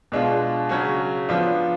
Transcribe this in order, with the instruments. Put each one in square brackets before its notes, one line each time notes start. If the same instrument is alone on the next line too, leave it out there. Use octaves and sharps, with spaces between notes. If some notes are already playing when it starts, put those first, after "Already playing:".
[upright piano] B2 G#3 D4 F4
C#3 F#3 C#4 F#4
F3 B3 D4 F4